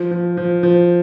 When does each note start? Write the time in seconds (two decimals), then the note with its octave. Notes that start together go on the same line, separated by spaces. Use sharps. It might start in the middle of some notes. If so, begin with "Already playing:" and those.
Already playing: F3
0.11 F3
0.37 F3
0.63 F3